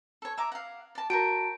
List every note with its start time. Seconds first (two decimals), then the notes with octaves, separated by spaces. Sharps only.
0.22 A4 C#5
0.38 E5 A#5 D6
0.52 F5 F#5
0.95 D5 A5
1.10 F#4 A#4 C#5 G5 A5 D7